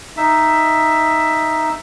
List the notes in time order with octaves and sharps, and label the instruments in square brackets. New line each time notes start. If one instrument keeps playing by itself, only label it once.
[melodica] D#4 E5